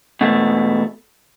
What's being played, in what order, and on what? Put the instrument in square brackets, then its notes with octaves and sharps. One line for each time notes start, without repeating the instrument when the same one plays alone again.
[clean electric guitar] E2 B2 A3